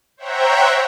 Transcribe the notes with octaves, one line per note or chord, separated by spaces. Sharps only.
C5 C#5 E5 F#5 G5 A#5